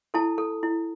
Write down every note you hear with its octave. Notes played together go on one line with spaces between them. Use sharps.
E4 A4 A5
A4
E4